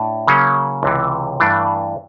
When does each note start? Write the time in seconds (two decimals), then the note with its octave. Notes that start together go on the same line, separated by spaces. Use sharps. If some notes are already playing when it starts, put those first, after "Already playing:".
Already playing: A2 D4
0.28 C#3 F#3 A#3 C#4
0.83 C#2 C3 E3
1.40 G2 E3 A3 D4